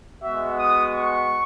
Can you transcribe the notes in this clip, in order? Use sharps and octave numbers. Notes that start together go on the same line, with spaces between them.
G#3 B3 F#4 E5
D#6
C#6